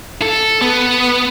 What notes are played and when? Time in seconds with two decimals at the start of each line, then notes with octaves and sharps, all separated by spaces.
0.22 A4
0.62 B3